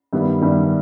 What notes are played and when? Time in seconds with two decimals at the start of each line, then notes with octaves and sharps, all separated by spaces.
0.13 G2 D#3 G3 B3 E4
0.41 G2 D#3 G3 B3 E4